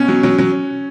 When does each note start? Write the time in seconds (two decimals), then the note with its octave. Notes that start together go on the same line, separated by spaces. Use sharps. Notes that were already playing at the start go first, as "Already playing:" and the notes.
Already playing: B2 C#4
0.08 F#3
0.23 F#3
0.38 F#3